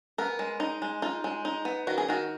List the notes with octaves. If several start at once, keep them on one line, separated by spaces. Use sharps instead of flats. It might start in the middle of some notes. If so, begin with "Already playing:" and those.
B3 A#4
G#3
D#4
G#3
D#4 F4
G#3
D#4
B3
D#3 F#4
G#4
D#3 F#4